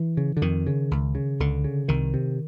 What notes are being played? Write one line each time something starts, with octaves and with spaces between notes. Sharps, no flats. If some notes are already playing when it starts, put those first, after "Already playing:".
Already playing: E3
C#3
D3
F2 D#3
C#3
C#2
C#3
C#2 D3
C#3
C2 D#3
C3